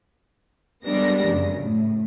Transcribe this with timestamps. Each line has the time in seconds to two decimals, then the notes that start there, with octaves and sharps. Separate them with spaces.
0.84 G3 G#3 B3 D4 A#4 A#6
1.28 F#2 C#3
1.61 A2